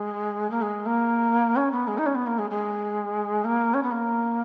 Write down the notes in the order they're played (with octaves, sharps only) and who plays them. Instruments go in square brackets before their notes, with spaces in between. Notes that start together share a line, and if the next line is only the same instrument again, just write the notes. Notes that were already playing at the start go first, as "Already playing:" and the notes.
Already playing: [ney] G#3
A#3
G#3
A#3
C#4
B3
G#3
D#4
C#4
B3
A#3
G#3
G#3
A#3
C#4
B3
A#3